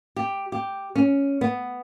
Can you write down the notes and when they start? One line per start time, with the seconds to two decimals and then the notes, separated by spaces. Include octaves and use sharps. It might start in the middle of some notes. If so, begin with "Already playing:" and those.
0.16 G4
0.52 G4
0.95 C#4
1.41 B3